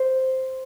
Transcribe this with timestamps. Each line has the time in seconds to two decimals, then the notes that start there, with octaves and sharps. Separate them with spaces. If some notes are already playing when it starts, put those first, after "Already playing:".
Already playing: C5